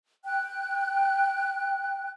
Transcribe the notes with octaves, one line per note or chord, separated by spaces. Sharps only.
G5 F#6